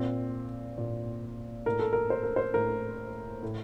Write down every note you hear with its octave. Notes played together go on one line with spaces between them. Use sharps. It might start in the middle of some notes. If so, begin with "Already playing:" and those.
Already playing: A#2 C4
A#2
A2 A#4
A4
A#4
C5
A#4
C5
A2 A#4
A2